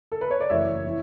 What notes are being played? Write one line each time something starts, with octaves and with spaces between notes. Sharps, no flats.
A4
B4
C#5
D5
F#1 F#2 E3 A3 C#5 E5
E3